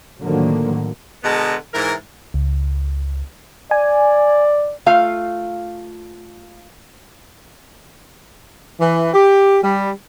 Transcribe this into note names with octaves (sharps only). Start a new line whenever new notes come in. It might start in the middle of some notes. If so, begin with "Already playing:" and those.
A2 D3 D#3 F3 F#3 A#3
B2 D3 G#3 B3 A5 A#5
G#2 E3 E4 A#4
C#2
D5 G#5
A3 F4 F5
E3
G4
G3